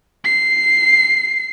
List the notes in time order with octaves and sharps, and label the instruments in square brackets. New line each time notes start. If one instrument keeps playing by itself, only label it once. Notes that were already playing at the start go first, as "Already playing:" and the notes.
[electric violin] C7